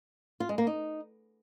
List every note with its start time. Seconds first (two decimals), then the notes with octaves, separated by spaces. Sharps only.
0.40 F4
0.49 G#3
0.58 A#3
0.67 D#4